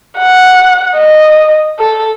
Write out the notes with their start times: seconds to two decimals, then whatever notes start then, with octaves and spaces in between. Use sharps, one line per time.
0.18 F#5
0.96 D#5
1.79 A4